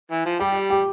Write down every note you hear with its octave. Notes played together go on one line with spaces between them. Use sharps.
E3
F3
G3 G4
G4